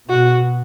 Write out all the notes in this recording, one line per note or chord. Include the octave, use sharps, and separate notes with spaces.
B2 F#4